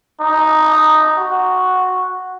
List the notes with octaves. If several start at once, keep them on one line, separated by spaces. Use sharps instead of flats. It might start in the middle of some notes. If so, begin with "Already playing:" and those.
D#4
F#4